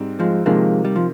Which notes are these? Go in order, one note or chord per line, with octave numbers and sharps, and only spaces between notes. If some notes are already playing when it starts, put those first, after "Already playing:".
Already playing: G#2 G3 C4
F3 G#3
C3 D#3 F3 G#3 A#3
G3
F3